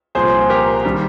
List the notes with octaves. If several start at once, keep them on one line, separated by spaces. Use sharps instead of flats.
C2 A#2 F3 G#4 C5
G4 A#4
D#3 G3